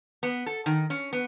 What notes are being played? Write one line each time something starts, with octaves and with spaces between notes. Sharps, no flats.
B3
A4
D#3
C#4
B3